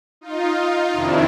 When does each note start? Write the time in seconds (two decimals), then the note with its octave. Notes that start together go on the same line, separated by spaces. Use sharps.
0.21 D#4 F4
0.93 F2 C3 D#3 D4 E4